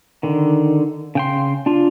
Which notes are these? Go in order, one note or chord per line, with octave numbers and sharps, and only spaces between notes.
D3 D#3
C#3 G5 C6
D4 F4